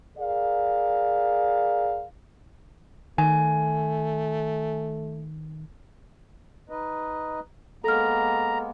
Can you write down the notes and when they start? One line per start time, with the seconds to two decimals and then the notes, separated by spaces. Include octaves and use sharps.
0.17 G#4 A#4 D5 F5
3.18 D#3 A3 G#5
6.70 D#4 B4 D#5
7.84 G#3 A#3 B3 A4 A#5 F6